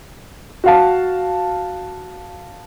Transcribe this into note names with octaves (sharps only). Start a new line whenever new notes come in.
F#4 F5 A5